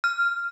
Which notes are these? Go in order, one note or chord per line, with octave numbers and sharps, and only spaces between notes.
F6